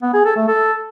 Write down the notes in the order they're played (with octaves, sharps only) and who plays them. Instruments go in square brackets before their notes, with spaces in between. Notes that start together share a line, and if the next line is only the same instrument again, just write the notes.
[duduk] B3
G#4
A4
A3
A4